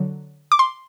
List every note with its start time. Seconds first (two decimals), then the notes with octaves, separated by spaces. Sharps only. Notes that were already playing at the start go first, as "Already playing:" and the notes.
Already playing: D3 F#3
0.52 D6
0.59 C6